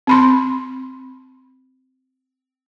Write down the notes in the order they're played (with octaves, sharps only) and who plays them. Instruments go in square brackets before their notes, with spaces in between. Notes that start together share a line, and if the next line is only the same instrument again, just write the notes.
[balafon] C4 B5 C6